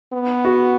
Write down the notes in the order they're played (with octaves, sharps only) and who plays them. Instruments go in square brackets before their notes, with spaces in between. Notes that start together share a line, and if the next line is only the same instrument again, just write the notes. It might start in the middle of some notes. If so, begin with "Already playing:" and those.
[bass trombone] B3
[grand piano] F#4